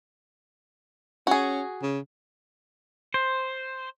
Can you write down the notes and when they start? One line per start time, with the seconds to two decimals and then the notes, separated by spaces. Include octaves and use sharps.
1.27 C#4 F#4 G#4
1.82 C#3
3.14 C5